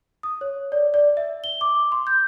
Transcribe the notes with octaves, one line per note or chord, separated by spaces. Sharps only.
D#6
C#5
D5
D5
E5
G7
D6
C6
G6